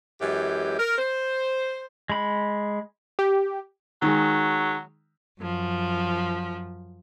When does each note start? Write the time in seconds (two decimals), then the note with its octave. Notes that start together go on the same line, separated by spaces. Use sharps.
0.21 F#2 E3 G#3 G4
0.78 A#4
0.98 C5
2.10 G#3 B5
3.19 G4
4.02 D#3 F#3 G#3
5.40 F#2 F3